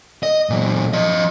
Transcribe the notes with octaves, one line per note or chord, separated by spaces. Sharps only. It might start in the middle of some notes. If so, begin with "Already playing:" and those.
D#5
A#2 F#3
F3 D#5